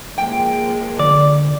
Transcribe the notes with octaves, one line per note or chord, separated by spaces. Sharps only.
F3 G#3 A#3 G5
D3 D5